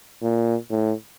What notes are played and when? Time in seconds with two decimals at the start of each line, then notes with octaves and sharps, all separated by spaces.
0.22 A#2
0.70 A2